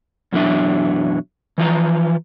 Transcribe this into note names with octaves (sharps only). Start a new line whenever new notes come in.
F#2 B2 E3 F#3 D4 E5
E3 F3 B4 A#5